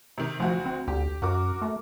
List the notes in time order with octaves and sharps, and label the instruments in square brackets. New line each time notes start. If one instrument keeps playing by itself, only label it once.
[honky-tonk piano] C3 D#3
[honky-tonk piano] D2 F#4 [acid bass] F3
[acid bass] C4
[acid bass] D2 [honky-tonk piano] G4
[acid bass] F#2 [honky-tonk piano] F#4 A#4 D6
[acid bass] A3